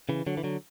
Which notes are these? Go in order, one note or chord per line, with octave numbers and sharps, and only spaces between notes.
C#3 E3
D3 F#3
E3
D3 F#3